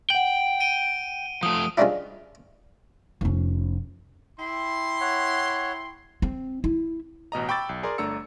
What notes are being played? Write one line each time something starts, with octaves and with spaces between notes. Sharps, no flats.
F#5 G5 F#7
D7 D#7 G7
F3 A3 D#6
F3 G3 G#3 C#4 D4 E4
F1 C#4
E4 G5 C6
C#5 F#5
C4
E4
A1 B2 D#5 A#5
G5 B5 C#6 D6 E6 A6
B1
G#4 A#4 D5 C6
G1 A3 D4 A#5 E6 C#7